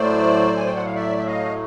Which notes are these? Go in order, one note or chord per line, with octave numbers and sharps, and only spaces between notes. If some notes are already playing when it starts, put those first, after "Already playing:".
Already playing: A2 F#3 A3 C5 D5
G#5
G5
F#5
F5
D5 E5
E5
D#5 F5